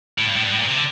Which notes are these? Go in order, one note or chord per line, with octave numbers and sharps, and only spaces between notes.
A2
G2
A2
G2
A2
A#2
C3
D3